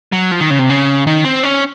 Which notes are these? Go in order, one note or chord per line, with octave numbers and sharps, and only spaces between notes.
F#3
F3
D#3
C#3
C3
C#3
D#3
C4
C#4